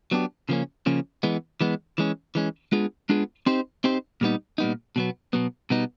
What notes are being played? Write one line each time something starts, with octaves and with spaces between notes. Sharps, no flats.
F#3 B3 D4 G4
C#3 F3 A#3 C#4
C#3 F3 A#3 C#4
E3 G#3 B3
E3 G#3 B3
E3 G#3 C#4
E3 G#3 C#4
G#3 B3 D4 F4 G#4
G#3 B3 D4 F4 G#4
C4 D#4 G4 C5
C4 D#4 G4 C5
A#2 G3 B3 D#4
A#2 G3 B3 D#4
B2 F#3 B3
B2 F#3 B3
B2 G3 B3 D#4